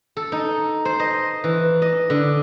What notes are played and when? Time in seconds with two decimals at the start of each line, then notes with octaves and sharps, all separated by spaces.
0.17 A4
0.32 D#4
0.85 C5
0.99 D#5
1.44 E3
1.82 D#5
2.10 D3